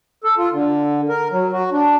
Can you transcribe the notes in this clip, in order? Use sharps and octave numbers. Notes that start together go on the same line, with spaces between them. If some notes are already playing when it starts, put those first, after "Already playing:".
A4
F4
D3
A#4
F#3
F#4
D4